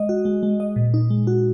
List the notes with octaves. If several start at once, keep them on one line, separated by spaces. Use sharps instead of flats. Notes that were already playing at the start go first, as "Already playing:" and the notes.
Already playing: G#3 D#5
F#4
G#3
G#3
D#5
A#2
D#4
G#3
F#4